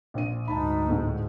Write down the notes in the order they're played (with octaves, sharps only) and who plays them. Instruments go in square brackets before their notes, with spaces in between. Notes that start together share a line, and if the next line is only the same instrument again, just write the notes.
[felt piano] A#1 C5 D#7
[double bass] D2 G#2 [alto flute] D#4 [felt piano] A5 B5
[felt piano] A2 G#3